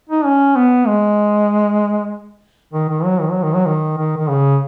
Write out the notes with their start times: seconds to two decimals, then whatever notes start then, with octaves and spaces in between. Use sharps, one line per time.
0.09 D#4
0.25 C#4
0.56 B3
0.87 G#3
2.73 D#3
2.89 D#3
3.05 F#3
3.20 D#3
3.31 F#3
3.43 D#3
3.55 F#3
3.66 D#3
3.98 D#3
4.17 D#3
4.30 C#3